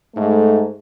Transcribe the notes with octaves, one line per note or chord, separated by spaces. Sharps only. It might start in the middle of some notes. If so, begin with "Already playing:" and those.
G#2 A3